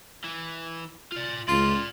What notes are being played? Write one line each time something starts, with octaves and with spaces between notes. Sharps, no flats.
E3
F4 D5
C#2 F4 D5 F5